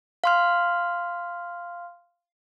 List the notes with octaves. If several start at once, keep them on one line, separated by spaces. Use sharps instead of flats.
F5 C6 F6